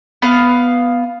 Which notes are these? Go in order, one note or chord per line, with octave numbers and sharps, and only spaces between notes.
B3 F5